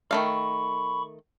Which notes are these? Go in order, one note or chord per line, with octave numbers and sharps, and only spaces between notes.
D#3 A3 F5 B5 C#6